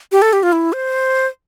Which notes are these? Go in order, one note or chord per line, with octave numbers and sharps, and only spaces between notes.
G4
A4
G4
F4
E4
C5